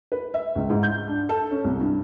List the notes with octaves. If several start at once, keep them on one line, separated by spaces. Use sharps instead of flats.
B4
E5
C#2
G#2
G6
D4
A4
C#4
C2
G2